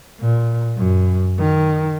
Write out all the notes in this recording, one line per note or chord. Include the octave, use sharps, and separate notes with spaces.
A#2
F#2
D#3